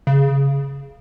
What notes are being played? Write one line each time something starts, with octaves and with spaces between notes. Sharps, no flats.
C#3